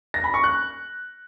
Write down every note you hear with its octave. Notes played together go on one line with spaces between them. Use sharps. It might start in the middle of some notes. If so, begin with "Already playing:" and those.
A#6
B5
C#6
F#6